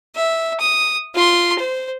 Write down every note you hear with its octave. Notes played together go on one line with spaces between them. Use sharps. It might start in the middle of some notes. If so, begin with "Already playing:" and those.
E5
D#6
F4 C6
C5